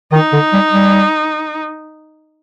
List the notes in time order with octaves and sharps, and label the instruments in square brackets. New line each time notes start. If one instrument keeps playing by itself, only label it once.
[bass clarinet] D#3 [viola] D#4
[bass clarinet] D3
G3
G3